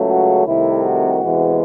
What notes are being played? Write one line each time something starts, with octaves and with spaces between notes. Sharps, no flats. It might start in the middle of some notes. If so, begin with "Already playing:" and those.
Already playing: C#2 C#3 F#3 A3
F#4
C2 C3 D#3 A3 E4
F#4
E2 C3 E3 G#3